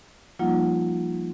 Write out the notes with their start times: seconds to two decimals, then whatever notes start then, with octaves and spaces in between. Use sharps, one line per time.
0.39 F3 G3 A#3 D#4 F4 F#5